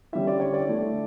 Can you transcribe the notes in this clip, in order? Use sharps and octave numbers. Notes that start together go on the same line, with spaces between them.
D3 G3 C#4 E4 E5
D5
C#5
D5
D3 A3 E4